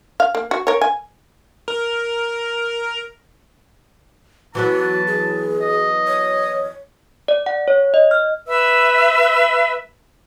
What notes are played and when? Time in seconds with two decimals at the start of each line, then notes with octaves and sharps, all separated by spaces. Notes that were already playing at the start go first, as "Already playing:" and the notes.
0.20 F5
0.35 A#3
0.51 F#4
0.67 A#4 C#5
0.81 G#5
1.68 A#4
4.55 E3 F#3 B3 F#4 A5
5.07 G#4
5.61 D#5
6.07 C#5
7.28 D5
7.46 F#5
7.68 C#5
7.94 D#5
8.11 F6
8.48 B4 E5 E6